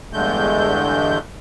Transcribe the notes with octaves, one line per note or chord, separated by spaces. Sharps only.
E2 G2 D3 G#3 A3 G6